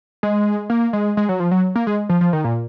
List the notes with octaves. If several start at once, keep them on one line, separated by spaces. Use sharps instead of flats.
G#3
A#3
G#3
G#3
F#3
F3
F#3
A#3
G#3
F3
F3
D#3
A#2